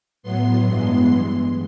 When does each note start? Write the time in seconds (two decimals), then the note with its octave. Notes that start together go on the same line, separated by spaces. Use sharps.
0.23 A2 F#3 B3 C6
0.65 G2 E3 G#3 B3